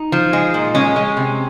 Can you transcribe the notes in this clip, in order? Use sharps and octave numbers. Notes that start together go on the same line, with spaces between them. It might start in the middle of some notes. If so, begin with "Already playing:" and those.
Already playing: D#4
F3
G#3
A#2
G#3 C#4
G#3
C3